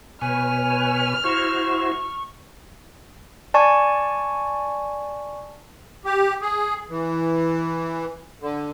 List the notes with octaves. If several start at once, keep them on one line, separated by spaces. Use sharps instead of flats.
B2 B4 C#5 G#5 F6
E4 F#4 C5 C#6
D5 G#5 A5 C#6
G4
G#4
E3
D3